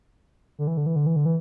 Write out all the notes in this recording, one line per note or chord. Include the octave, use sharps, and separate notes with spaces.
D3
E3
D3
E3
D3
E3
D3
E3